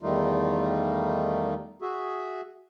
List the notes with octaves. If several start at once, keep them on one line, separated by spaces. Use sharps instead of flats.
E2 D#3 G3 A3 D#4 F4
F#4 G#4 E5